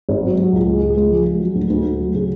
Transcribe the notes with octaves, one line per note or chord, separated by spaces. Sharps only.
G#1
F#3
F#3
C#2
G#3
C#2
G#3
F3
G#3
F#3
D2
D2
D2
F#3
C#3